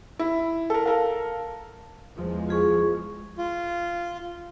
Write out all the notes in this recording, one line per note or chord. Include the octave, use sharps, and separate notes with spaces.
E4
A4 A#4
A4 A#4 F5
E2 F3 G#3
F4 G#4 C#6
F4